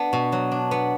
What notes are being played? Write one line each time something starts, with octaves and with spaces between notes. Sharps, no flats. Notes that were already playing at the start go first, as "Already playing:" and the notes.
Already playing: B3 D4
B2
F#3
D4
B3